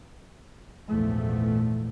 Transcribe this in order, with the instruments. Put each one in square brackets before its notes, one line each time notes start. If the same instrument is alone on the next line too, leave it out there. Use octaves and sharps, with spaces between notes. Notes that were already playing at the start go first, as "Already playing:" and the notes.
[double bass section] A#1 E2 G#2 F3 A3